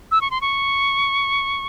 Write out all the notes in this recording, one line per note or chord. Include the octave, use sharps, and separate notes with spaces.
E6
C#6
C6
C#6